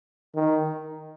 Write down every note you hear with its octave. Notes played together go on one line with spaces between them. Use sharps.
D#3